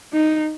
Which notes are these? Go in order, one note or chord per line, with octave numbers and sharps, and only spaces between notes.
D#4